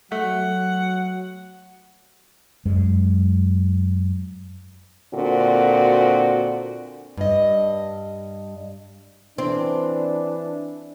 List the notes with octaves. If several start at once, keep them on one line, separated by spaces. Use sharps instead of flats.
F#3 A3 F#5
F#2 G#3
A#2 D3 C4 F#4
G2 D#5
E3 C4 D4